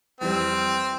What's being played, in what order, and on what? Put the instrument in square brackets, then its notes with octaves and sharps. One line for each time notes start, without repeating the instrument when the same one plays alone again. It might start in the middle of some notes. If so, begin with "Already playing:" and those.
[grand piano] F2 E3 G3 [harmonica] C4